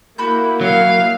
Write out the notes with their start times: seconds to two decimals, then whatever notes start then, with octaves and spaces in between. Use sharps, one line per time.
0.18 A#3 E4 F#4 B5 G6
0.61 F#3 F5